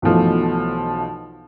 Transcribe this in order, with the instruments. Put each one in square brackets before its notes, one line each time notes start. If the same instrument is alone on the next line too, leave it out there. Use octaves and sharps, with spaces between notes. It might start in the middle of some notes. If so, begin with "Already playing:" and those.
[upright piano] B1 B2 E3 F3 A3